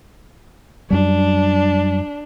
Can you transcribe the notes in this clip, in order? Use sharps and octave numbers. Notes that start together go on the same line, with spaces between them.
F#2 G3 D4